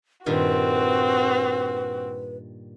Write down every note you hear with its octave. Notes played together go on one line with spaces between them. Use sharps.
G2 A#2 D#3 C4 F#4 B4